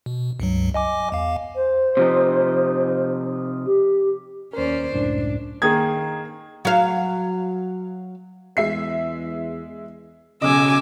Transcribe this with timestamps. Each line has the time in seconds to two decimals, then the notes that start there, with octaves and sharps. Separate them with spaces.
0.06 B2
0.40 C#2 G2 F#3
0.74 D#5 G#5 D6
1.12 E2 F5
1.56 C5
1.97 C3 F3 D#4
3.66 G4
4.53 D#2 C#4 A#4 C5 D5
4.93 C#2 F#2 A2 D4
5.62 D#3 A#3 G#4 D#6 G#6
6.65 F#3 F5
8.57 E2 G#3 E5 C7
10.42 B1 C#3 D#5 G#5 D6 E6